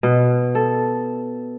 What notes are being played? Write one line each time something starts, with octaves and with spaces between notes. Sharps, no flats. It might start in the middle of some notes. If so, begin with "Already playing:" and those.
B2
A4